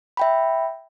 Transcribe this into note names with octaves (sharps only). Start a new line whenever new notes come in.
E5 G5 B5